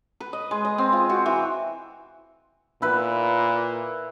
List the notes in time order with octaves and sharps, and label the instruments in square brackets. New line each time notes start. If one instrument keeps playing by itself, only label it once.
[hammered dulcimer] B4
D#5
G#3
D#5
C4
F4
F#4
E3
[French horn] A#2 [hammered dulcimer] E4 B4